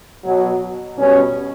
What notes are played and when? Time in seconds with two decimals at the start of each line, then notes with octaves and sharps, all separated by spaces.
0.25 B2 F#3
0.99 B2 G3 C#4